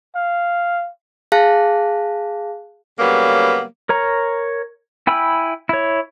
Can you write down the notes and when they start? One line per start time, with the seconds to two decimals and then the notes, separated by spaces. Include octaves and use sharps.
0.15 F5
1.32 G#4 F5 A5 F#6 A#6
2.99 C#3 F#3 G3 A#3 B3
3.89 A#4 C#5 A#5
5.07 E4 G5 G#5 B5 E6
5.69 E4 C#5